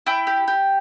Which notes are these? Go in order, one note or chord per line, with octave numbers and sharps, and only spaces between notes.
E4 G5
G4
G4